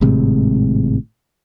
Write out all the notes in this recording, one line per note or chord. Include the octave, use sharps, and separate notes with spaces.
G#1 A2 C3 G#3